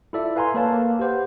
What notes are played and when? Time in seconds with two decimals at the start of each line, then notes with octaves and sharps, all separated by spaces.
0.13 E4 F4 A4 D5 E5
0.36 B4 F5 G#5 A#5 C6
0.54 A#3 A4 B4 C#5 F5 A5
0.73 A#3
0.99 G4 B4 C5 F#5